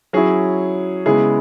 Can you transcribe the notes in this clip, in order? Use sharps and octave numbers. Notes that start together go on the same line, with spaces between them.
F#3 C#4 E4 G#4
C#3 G#3 B3 E4 G#4